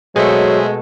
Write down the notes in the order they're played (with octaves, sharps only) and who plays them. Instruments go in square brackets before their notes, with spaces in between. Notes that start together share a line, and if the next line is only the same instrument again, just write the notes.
[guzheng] B2 A3 [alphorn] F#3 [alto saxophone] G#3 [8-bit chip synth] G#4 C5 E5